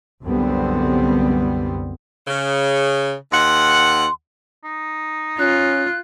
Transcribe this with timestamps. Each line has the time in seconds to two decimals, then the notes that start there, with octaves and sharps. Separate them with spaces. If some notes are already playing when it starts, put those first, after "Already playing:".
0.24 C2 F#2 D3 G3 B3 C4
2.27 C#3
3.32 D#2 F#5 C6
4.64 D#4
5.39 C#4 F4 F#6